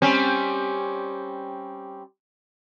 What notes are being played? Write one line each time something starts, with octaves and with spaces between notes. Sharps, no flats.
G3 C4 C#4